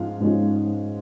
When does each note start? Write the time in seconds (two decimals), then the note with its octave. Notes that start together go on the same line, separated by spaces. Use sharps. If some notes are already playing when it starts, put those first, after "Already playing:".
Already playing: G#2 F3 G#3 C#4 F5
0.20 G#2 F3 G#3 C#4